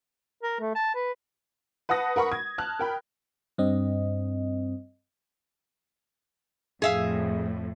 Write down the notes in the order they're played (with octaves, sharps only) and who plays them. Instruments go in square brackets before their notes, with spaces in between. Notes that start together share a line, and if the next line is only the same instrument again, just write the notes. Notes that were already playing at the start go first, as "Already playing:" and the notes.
[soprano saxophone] A#4
A3
A5
B4
[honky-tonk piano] B4 F#5 A5 D#6 A#6
A#4 F#5 B5 C#6
G#6
A5 F6 F#6
A#4 G5 B5
[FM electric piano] G2 C4 D#5
[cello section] F2 A2 [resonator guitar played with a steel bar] G#4 E5 F5